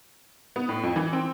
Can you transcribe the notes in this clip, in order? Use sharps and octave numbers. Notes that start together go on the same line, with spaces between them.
B3
A2
F2
E3
C4